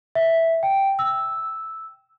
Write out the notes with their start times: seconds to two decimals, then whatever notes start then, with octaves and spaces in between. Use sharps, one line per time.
0.15 E5
0.63 G5
0.99 E6